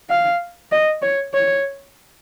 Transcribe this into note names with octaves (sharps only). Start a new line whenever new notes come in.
F5
D#5
C#5
C#5